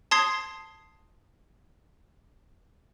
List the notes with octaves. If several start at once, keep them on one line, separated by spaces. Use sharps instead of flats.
A5 C6 D#6 G#6 C7